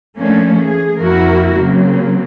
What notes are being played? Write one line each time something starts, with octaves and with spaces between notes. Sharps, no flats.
F3 A3 A#3 C#4 D4
E3 G#4
F2 F3 A#3 E4 F#4 A#4
C#3 F#3 A#3 C4